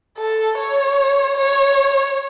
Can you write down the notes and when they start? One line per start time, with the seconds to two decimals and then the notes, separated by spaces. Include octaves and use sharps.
0.18 A4
0.58 C#5
1.36 C#5